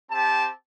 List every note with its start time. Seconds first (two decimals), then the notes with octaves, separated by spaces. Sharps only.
0.10 C4 G4 A5